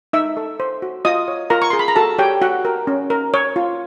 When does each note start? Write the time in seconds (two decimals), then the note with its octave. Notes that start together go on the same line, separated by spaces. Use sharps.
0.13 D#4 E5 E6
0.37 A4
0.60 C5
0.82 F#4
1.05 F4 D#5 D#6
1.28 C#5
1.50 F4 A#4 A#5
1.62 C#6
1.70 G#4 C6
1.79 B5
1.88 A#5
1.96 F#4 A4 A5
2.19 G4 C#5 G5
2.42 F#4 F#5
2.65 A#4
2.87 C#4
3.10 A#4
3.34 C#5
3.56 F4